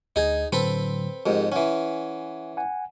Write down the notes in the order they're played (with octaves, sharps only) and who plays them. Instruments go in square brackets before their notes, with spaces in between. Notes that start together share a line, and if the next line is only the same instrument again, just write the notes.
[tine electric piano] D2 D#5 G#6 [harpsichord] D#4 G#4
[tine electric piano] A2 D3 F#3 [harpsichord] C4 A4 B4
[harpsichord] F2 G#2 [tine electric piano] G4 G#4 A#4
[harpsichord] E3 C#4 [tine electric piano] F#5 G#5
[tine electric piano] F#5 G#5